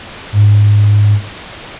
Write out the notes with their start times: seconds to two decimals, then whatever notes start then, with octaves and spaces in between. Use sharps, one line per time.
0.33 G#2